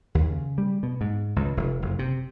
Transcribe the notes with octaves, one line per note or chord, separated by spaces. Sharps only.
D#2
C#3
G3
B2
G#2
C#2
F1
F#1
C3